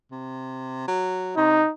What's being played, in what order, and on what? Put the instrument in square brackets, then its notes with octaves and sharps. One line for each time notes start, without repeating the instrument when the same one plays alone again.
[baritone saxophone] C3
F#3
[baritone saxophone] C3 [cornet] D#4